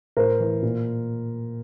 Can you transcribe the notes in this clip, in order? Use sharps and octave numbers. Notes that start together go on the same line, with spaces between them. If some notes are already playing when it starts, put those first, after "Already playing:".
A2 A#4 C5
E3
A#2